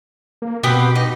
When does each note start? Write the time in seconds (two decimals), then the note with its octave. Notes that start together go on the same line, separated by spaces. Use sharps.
0.42 A#3
0.63 B2 B3 C4 G4
0.96 D#4